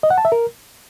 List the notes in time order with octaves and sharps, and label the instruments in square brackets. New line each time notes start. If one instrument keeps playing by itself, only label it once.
[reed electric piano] D#5
F#5
A5
E5
A#4